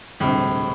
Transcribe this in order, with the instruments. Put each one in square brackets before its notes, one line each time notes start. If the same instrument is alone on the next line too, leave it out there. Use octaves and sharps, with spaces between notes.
[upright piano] E1 D2 C3 G3 C4 [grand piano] A2